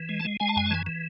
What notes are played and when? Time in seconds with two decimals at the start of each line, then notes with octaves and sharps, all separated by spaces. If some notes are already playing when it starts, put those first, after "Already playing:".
Already playing: E3
0.09 G#3
0.20 A5
0.25 G#3
0.40 G#3 G#5
0.49 A5
0.56 F#2 G#5
0.66 A5
0.71 E3 G#5
0.86 E3